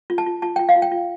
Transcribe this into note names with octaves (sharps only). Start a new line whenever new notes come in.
F4
A5
F4
F4 A5
F4 G5
F5
F4
G5
F4